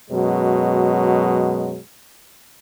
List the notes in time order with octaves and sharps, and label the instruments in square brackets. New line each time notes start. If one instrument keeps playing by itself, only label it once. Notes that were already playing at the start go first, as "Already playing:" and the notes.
[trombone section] F#2 B2 F#3 G#3